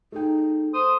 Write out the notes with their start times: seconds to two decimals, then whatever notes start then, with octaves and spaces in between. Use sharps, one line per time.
0.12 A3 D#4 G#4 G5
0.74 C5 D#6